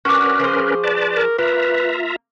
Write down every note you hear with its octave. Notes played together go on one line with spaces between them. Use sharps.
C#4 D4 F#4 A#4 B4 C#6 D6
F3 G#4 C5
B4 D5 A5
A#4
A#3 F4 B4 E5 A#5